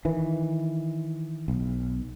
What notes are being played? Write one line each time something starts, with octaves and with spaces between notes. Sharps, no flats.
D#3 E3
B1